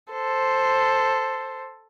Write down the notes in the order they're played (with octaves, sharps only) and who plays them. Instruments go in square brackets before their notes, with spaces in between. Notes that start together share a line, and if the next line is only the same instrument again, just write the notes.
[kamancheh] A4 C5